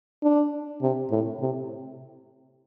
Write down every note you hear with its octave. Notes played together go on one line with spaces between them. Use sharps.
D4
C3
A2
C3